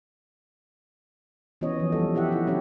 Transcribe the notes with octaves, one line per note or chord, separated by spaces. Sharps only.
E3 B3 C#4 F#4 C#5 D#5
F3
F#3 G3 A4 D#5
E4 G4 E5 F#5
D#4 E4
F#3 G3 C#4 D4 G4 C#5